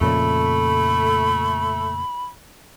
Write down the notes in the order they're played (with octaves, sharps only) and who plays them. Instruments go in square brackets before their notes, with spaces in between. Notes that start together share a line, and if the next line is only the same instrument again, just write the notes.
[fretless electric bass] F2 A#2 C#3 [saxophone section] A3 [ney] B5